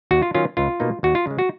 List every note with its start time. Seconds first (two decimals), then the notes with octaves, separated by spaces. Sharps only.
0.11 D#2 F#4
0.22 F4
0.34 D#3 F#3 C#4 F4
0.57 C#2 F4
0.80 B2 A#3 D#4
1.03 D#2 F#4
1.15 F4
1.27 C#3 G#3
1.39 F#4